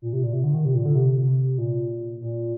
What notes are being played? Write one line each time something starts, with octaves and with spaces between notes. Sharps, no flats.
A#2
C3
A#2
C3
D3
D#3
C3
A#2
D3
C3
A#2
A#2